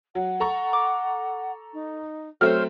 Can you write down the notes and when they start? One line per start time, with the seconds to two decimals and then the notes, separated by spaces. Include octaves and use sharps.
0.15 F#3 F#5
0.40 A4 A#5 C#6
0.73 D6
1.73 D#4
2.41 F#3 A3 C4 A4 C5 C#5 F6